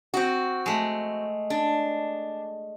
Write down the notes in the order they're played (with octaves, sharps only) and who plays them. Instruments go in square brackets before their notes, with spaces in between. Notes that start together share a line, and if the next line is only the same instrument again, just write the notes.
[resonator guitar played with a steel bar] C4 F#4
[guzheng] G#3 A3
[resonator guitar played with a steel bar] D4